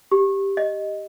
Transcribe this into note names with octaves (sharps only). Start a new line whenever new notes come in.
G4
D#5